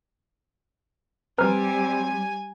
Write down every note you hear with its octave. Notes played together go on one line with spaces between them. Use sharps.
G3 C4 B4 G#5 A#5 F6